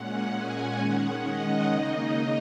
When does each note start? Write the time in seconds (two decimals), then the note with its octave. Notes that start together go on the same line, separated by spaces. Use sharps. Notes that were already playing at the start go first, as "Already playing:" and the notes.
Already playing: A#2 G#3 C#4 F#5
0.32 G#5
0.77 D#3 G#3 C#4 F#5
1.24 D#5
1.70 C#3 A#3 D#4